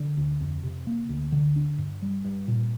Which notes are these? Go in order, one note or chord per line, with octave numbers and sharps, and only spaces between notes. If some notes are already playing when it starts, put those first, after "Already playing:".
Already playing: D3
D2
F2
C3
A#3
D2
D3
D4
G2
G3
G2
A#2